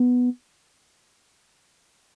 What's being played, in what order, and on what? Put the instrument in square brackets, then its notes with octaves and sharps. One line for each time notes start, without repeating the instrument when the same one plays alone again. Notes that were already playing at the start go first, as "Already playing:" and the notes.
Already playing: [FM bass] B3